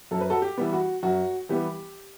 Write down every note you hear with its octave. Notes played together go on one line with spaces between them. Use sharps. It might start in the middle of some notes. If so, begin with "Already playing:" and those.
F#2 A4
B4
F#4 A4
G4
E3 G3 B3
F#4
F#2 F#4
E3 G3 B3 G4